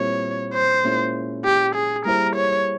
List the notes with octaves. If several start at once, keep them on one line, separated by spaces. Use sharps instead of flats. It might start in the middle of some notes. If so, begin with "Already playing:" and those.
Already playing: A#2 G3 C4 E4 C#5
C5
A#2 G#3 C#4 E4
G4
G#4
G3 A#3 E4 G#4 A#4 C5
C#5